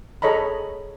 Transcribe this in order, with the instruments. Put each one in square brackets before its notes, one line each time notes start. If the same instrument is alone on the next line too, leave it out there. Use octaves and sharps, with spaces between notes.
[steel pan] G#4 A4 C#5 D#5 A#5 B5